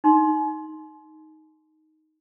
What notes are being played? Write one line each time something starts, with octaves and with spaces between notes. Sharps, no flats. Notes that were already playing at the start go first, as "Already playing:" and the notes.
D#4 C6